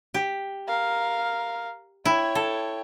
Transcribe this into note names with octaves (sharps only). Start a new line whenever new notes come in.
G4
A#4 F5
E4 C#5 G5
A4